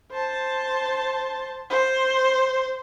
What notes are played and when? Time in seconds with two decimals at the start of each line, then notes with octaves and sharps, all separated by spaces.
0.12 C5 A5
1.70 C5